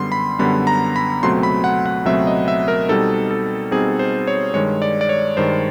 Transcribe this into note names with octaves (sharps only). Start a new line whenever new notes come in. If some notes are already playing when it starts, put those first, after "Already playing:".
Already playing: F#2 D3 G3 B3 C6
B5
F#2 D3 G3 B3 B5
A#5
B5
C#2 B2 F#3 A3 C4 C6
B5
F#5
F#5
C#2 B2 F#3 A3 C4 E5
D#5
E5
A#4
B2 G3 C4 D#4 A4
A4
B2 G3 C4 D#4 G#4
C5
C#5
G2 D#3 G#3 C#5
D5
D5
C#5
G2 D#3 G#3 C5